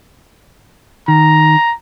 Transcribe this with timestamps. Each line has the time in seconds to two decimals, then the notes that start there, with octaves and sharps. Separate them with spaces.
1.08 D#3 A#5